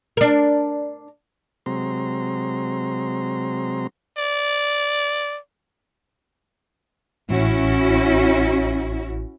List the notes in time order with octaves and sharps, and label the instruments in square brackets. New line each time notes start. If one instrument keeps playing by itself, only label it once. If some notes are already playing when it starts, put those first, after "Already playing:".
[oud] D4 A#4
[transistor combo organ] C3 F#3 G#3 C4 A#5 C6
[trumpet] D5
[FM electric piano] A1 [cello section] C#4 E4 F#4